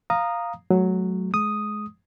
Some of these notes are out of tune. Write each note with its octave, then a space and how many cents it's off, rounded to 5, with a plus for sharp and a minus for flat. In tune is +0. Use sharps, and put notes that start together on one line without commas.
F5 +0 A#5 +0 D#6 -10
F#3 +0 A3 -30
G#3 +25 D#6 +0